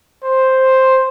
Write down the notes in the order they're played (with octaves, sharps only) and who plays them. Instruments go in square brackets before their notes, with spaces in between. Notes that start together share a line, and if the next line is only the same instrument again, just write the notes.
[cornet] C5